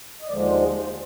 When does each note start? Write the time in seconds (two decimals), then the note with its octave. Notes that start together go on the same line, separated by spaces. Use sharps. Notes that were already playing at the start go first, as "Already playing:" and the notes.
0.22 D#5
0.28 D#2 D3 F3 G#3 D5
0.45 C5
0.62 G#4
0.80 C5